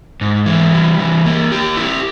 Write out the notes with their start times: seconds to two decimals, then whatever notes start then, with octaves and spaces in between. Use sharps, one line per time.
0.21 G#2
0.46 E3
0.73 G3
0.99 E3
1.26 A#3
1.52 G4
1.77 E4